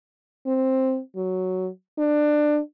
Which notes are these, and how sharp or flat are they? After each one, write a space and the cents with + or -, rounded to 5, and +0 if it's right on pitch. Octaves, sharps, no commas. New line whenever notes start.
C4 +5
F#3 +5
D4 +20